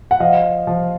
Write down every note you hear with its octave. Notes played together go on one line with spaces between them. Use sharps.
F#5
F3 D#5 F5
F3